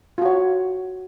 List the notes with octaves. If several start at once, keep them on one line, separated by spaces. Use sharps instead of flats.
F4 F#4 C#5